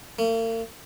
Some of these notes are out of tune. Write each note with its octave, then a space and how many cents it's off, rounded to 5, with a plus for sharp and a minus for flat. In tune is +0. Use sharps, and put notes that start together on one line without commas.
A#3 -45